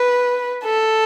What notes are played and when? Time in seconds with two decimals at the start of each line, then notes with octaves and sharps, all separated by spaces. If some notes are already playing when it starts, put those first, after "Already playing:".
Already playing: B4
0.65 A4